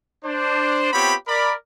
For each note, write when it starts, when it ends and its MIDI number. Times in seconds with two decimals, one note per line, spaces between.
0.24 0.93 62
0.24 0.93 72
0.93 1.15 59
0.93 1.15 60
0.93 1.15 65
0.93 1.15 67
0.93 1.15 73
0.93 1.15 83
1.28 1.54 70
1.28 1.54 74
1.28 1.54 83